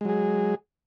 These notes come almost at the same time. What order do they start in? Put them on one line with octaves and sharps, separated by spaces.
G#3 F#3 G#4